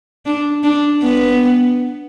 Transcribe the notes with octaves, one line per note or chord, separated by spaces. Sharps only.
D4
D4
B3